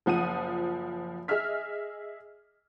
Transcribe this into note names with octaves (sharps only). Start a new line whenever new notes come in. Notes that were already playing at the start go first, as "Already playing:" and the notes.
F#1 F3 F#5 D#6 D#7
G#4 D#5 E5 F6 B6